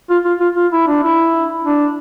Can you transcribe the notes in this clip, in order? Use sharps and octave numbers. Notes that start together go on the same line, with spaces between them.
F4
F4
F4
F4
E4
D4
E4
D4